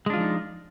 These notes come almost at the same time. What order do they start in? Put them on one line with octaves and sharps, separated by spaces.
G#3 D4 F4 F3 D#4